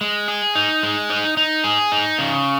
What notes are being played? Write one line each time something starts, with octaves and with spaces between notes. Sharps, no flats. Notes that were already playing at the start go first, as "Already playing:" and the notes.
G#3
G#4
D#4
G#3
D#4
D#4
G#4
D#4
C#3